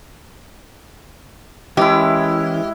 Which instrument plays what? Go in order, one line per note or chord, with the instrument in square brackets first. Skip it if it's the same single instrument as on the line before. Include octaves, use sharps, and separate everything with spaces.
[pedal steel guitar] E3 C#4 A#4 [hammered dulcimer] G#3 E4 [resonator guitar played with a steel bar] G4